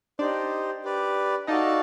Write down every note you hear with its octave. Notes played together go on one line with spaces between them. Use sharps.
D4 D#4 G4 C5 D5
G4 B4 D5
D#4 F#4 A4 D5 D#5 F5 A5